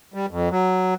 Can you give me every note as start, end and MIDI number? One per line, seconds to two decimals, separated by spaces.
0.14 0.26 55
0.31 0.49 41
0.51 0.94 54